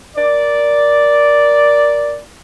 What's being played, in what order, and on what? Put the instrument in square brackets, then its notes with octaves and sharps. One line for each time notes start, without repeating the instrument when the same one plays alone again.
[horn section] A#4 D5